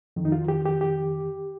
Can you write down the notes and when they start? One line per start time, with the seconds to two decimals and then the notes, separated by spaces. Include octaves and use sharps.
0.16 F2 D#3
0.25 D#4
0.32 F4
0.48 G4
0.66 G4
0.81 G4